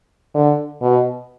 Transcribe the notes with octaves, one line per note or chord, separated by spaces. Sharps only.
D3
B2